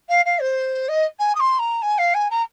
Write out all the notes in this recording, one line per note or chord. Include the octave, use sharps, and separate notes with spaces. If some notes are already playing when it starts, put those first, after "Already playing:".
F5
F5
C5
D#5
G#5
D#6
C6
A#5
G#5
F5
G#5
A#5